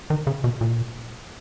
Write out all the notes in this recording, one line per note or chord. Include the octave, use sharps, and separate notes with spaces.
D#3
C#3
B2
A#2